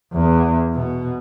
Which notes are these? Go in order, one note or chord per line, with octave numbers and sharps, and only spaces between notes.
E2
B2